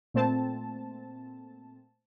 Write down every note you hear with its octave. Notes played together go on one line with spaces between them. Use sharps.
A#2 A3 C4 A5